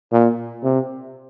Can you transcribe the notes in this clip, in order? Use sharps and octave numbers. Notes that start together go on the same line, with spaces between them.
A#2
C3